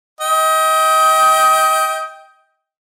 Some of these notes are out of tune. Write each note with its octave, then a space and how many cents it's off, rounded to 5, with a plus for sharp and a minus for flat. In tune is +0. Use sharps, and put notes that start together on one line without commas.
D#5 +30 G5 +0